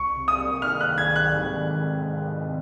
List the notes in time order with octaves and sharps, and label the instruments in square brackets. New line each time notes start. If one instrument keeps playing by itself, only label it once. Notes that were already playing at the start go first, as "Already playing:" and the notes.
Already playing: [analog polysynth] C2 [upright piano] C#6
[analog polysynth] C3
[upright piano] D#6
[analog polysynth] A#3
[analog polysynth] D#3 [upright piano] F6
[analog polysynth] C2 [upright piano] F#6
[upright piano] G#6
[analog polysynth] C3
[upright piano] F#6
[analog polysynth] G#2
D#3
C4
G#3
G#2